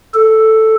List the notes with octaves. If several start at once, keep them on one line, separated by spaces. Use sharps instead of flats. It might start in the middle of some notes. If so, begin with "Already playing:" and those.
A4